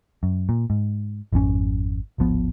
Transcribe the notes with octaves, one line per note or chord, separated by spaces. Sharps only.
F#2
A#2
G#2
G#1 F2 C4 C#4
D1 G#1 F3 B3